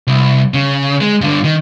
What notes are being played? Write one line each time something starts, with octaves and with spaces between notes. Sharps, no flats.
C2
C#3
G#3
G2 D3
D#3